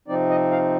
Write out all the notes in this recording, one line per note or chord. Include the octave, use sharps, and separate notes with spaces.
C3 F3 C4 D#4 D5
D#5
F5